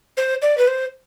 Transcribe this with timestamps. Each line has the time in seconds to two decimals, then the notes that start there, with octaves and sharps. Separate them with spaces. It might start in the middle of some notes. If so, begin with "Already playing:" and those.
0.17 C5
0.42 D5
0.58 B4
0.68 C5